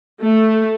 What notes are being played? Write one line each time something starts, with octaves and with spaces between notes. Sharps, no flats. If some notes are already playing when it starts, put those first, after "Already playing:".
A3